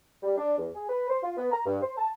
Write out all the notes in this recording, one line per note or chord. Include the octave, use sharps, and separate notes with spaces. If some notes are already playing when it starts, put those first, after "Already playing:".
G3
D4
E2
G#4
B4
C5
F4
B3
A#5
G2
C5
A5